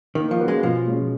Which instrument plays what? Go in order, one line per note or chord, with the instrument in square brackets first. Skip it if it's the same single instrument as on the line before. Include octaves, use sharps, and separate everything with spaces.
[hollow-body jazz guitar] D#3 [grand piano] A#3
[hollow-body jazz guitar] F3
[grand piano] C#4 F#4 B4
[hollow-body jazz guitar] G#3
[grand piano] B2 [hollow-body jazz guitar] F3
[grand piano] G#3 C#4